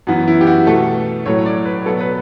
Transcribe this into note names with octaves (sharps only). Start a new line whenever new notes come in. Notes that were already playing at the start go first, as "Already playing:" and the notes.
F#2 E3 B3 F#4
E4
G4
F#4
B2 A3 A4
A2 F#3 A3 C#5
D5
B4
B2 F#3 B3 A4
B4